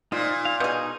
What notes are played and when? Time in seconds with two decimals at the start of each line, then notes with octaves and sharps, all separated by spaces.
0.12 A#2 D#4 F4 C5
0.45 F5
0.60 B2 D#4 G#4 D#6 G6